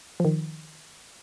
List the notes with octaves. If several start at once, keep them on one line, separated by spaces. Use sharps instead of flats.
F3
D#3